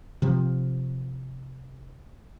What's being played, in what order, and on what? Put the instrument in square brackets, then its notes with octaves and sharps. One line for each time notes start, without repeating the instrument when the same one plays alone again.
[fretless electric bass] C3 F3